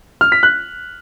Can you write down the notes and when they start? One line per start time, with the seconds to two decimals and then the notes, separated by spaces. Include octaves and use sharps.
0.21 F6
0.32 B6
0.43 F#6